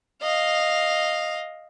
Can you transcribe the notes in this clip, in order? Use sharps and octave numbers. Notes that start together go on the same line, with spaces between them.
D#5 F5